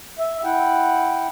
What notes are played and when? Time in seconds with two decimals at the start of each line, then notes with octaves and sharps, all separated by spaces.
0.19 E5
0.44 E4 F#5 G5